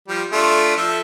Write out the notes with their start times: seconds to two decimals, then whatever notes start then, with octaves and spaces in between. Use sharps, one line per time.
0.08 F3 G3
0.33 A3 D4 F4
0.77 F3 A4 E5